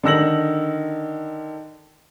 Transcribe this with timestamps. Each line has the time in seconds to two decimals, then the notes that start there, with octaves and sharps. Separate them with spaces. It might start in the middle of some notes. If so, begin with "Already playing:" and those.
0.03 D3 D#3 E6 A#6 F#7